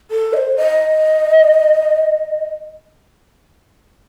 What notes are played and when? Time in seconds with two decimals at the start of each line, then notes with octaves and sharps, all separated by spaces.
0.11 A4
0.33 D#5
0.37 C5
0.57 D#5